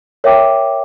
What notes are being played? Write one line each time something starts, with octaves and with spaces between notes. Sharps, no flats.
A#4 C#5 E5 G5 D6